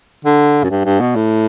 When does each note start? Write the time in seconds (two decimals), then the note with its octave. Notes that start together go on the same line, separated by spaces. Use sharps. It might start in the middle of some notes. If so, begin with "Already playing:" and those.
0.25 D3
0.64 F#2
0.70 G2
0.85 G2
1.00 B2
1.16 A2